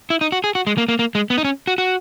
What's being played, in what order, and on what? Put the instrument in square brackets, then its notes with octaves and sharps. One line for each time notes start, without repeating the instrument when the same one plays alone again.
[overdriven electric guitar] E4
D#4
F#4
G#4
F#4
G#3
A#3
A#3
A#3
G#3
B3
D#4
C#4
F#4
F#4